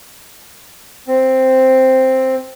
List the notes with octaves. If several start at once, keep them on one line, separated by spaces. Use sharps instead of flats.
C4